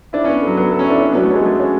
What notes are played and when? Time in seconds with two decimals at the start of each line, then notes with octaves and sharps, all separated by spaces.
0.13 D4 E4
0.24 C#4
0.27 B3
0.42 F#3 A4
0.57 F#3 B3
0.72 A4
0.79 C#4
0.86 D4 E4
1.00 C#4 D4
1.12 B3
1.15 F#3
1.23 A3
1.31 G#3 C#4
1.45 A3 G#4
1.60 C#4